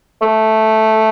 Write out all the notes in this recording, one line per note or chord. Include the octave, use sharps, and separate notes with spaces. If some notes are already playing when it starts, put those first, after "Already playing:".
A3